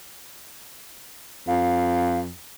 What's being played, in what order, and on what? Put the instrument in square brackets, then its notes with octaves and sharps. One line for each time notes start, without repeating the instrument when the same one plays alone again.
[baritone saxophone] F2 [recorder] F5